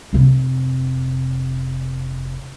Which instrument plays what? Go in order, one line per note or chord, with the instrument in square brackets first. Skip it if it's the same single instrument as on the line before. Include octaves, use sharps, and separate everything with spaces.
[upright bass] F1 C3